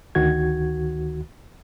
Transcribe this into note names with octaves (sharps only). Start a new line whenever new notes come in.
D2 D#3 F#4 G#6